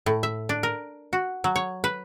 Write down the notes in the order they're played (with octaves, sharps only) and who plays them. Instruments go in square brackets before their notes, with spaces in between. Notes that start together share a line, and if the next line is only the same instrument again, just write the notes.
[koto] A2
E5
D4
A#4
F#4
F#3
C#5
B4